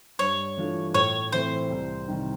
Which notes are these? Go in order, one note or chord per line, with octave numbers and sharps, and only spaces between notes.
G2 C#5
E3 A3 D4 F4
A2 C#5
E3 A3 C4 E4 C5
C2
C3 D#3 G3